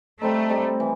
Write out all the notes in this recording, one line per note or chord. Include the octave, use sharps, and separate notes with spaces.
G3 A3 C4 D#4
G3 C4 D#4
E3